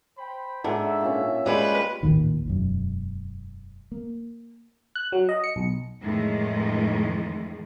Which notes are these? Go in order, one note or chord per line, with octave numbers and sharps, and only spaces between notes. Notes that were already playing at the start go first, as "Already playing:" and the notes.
C5 G5 B5
G#2 D4 A4 E5 F#5
A#2 C#4
G3 G#3 B4
A1 D#2 A#2 D#3
E1 F#2
A#3
F#6
F#3
D#5
C#7
B1
F2 A2 D#3 E3 G#3